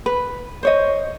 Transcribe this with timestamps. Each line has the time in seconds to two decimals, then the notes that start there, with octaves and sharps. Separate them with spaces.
0.06 B4
0.63 C5 C#5 D#5